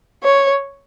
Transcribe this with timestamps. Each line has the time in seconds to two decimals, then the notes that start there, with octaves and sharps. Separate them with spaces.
0.24 C#5